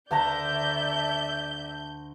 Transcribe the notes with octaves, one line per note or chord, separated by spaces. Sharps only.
D2 D5 E5 F#5 A5 A#5 G6